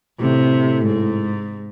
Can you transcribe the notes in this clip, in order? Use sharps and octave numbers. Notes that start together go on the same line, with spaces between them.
A2 C3
G#2